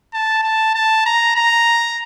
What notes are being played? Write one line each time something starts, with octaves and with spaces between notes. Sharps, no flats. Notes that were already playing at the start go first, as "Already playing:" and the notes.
A5
A5
A5
A#5
A#5